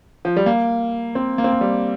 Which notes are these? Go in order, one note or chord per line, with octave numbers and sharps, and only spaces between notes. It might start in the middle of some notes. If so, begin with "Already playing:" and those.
F3
G3
A#3
C4
A#3
C4
A#3
G3